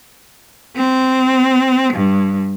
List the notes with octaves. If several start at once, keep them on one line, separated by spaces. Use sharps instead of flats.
C4
G2